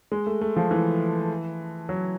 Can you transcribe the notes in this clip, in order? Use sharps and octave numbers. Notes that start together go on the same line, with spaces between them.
G#3
A3
A3
F3
E3
F#3